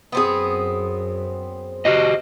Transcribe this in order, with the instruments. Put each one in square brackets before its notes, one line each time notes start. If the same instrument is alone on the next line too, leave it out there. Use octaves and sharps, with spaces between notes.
[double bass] F#2 [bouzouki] B3 C4 G#4
[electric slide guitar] F#4 G4 D#5